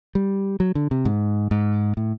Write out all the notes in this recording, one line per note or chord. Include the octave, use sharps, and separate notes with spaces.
G3
F#3
D3
C3
G#2
G#2
A2